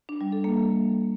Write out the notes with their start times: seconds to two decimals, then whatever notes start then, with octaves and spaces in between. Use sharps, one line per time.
0.09 D4
0.21 G3
0.32 A4
0.44 A#3